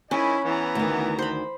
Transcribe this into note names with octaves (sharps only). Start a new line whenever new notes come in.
D#3 C#4 E4 D#5 G#5 B5
E3 B3 E4 A#5
D2 D#3
C5 B5